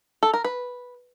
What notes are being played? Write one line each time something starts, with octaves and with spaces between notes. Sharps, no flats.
A4
A#4
B4